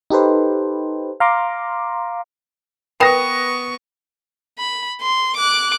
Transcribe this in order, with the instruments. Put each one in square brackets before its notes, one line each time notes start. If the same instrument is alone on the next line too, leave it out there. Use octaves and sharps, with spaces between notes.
[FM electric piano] D#4 G4 A4 B4 C5
F5 A#5 C6 D6
[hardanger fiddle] B3 C#6 [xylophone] A#4 G5 B5 [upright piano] B4 [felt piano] D#6 A#6
[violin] B5
C6
D6 F#6